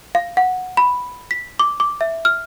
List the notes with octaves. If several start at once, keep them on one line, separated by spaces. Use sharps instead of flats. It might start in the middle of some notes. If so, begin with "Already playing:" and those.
F5
F#5
B5
B6
D6
D6
E5
F6